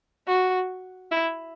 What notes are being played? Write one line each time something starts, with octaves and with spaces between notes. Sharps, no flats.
F#4
E4